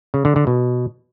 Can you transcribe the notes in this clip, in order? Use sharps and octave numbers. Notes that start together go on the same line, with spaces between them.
C#3
D3
D3
B2